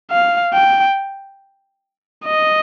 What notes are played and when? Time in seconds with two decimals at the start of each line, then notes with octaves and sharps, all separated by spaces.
0.11 F5
0.54 G5
2.25 D#5